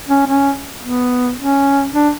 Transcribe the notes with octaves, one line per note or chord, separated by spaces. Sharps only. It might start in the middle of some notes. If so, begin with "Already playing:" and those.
C#4
C#4
B3
C#4
D4